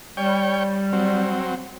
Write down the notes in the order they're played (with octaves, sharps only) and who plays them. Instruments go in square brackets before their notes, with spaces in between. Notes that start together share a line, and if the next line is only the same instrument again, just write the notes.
[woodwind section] G3 [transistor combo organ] C#5 G5
[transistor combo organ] F#3 C4